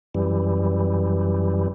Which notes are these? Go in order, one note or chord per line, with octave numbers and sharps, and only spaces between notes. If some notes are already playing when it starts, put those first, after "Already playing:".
F#2 E3 G3